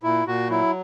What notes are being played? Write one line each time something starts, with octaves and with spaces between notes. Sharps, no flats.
A#2 E4
A#2 F#4
F#3 E4